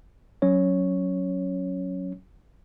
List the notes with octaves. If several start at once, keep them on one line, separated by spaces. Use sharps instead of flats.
F#3 C#4 C#5